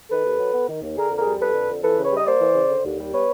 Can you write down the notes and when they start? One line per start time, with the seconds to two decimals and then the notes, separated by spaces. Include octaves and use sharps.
0.10 D#3 A4 B4
0.25 D#2
0.39 F#3
0.53 B3
0.68 D#3
0.82 D#2
0.96 D3 G#4 A#4
1.12 F2
1.18 G#4 A#4
1.25 G3
1.39 F2 A4 B4
1.54 D3
1.69 F2
1.83 E3 A4 B4
1.97 C#3
2.04 B4 C#5
2.11 G3 D#5
2.26 A#3 C5 D5
2.41 E3
2.55 C#3
2.70 D3
2.84 D#2
2.98 G3
3.13 B3 B4 C#5